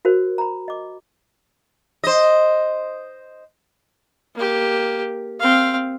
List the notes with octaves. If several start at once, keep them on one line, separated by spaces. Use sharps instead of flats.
F#4 A#4 C5
A#5 B5
D#5 D6
C5 D#5
A#3 G4
C4 F5